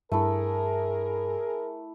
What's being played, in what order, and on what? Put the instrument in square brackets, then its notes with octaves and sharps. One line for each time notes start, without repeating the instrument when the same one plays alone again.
[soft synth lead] G2 [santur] A3 E4 [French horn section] G#4 A#4